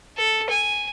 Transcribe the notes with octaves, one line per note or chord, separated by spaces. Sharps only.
A4
G#5